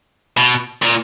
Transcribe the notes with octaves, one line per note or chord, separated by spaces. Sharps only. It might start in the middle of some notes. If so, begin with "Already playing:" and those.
B2
A#2